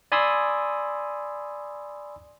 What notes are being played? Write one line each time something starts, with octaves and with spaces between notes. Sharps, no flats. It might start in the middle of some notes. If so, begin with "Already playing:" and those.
D5 G#5 B5 C6 D#6 E6